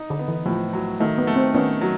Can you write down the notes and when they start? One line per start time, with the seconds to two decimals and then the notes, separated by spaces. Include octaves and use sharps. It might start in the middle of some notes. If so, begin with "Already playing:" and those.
Already playing: D#4
0.10 D3
0.19 B3
0.28 E3
0.46 A2 F3
0.73 F#3
1.00 D#3 A3
1.18 B3
1.27 A3
1.36 C4
1.55 D#3 B3 C#4
1.81 F#3